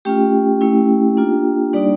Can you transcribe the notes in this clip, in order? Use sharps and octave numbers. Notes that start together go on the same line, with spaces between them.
A3 C#4 F4 G4 G5
A3 C#4 E4
A#3 D4 F4
G3 A#3 D4 D#4 D5